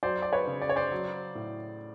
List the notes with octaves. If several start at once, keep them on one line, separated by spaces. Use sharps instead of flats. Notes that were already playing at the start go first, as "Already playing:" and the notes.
F#3 C5 D5
D5
B4 C#5
C#3
D5
C#5
C5 D5
F#3
A2